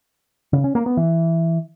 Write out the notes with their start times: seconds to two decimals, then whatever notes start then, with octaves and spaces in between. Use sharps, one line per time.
0.53 C#3
0.64 C#4
0.75 A#3
0.86 B3
0.97 E3